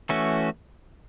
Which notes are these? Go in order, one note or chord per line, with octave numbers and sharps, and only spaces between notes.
E3 A3 C#4 F#4